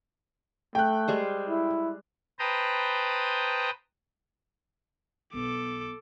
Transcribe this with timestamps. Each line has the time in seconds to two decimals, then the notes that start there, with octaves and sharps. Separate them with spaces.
0.75 A3 G5 F#6
1.08 G3 G#3 C5
1.49 E4
2.39 B4 C5 G5 A5 A#5 D#6
5.33 B1 B2 B3 A4 D6